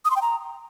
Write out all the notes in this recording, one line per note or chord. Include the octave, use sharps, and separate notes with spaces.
D#6
C6
G5
A#5